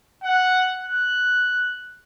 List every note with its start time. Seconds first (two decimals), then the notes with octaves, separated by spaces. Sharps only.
0.23 F#5
0.84 F#6